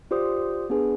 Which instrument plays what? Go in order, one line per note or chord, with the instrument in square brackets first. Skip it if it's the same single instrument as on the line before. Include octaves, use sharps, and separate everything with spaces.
[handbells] F4 G4 C5 D5 D#6
B3 D4 G#4 B4